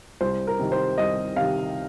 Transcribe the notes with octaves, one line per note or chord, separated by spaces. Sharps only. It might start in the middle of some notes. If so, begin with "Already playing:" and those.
C2 C5
A#4
C3 D#3
C5
C2 D#5
C3 D#3 F5